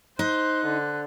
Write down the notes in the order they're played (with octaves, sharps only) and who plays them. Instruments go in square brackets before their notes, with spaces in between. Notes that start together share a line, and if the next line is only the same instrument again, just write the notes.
[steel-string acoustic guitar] D#4 [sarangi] C5 [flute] F#6
[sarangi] D3